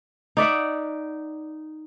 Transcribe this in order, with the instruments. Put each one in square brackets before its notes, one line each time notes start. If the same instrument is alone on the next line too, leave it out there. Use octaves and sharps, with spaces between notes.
[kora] D#4 D5 E5 F#5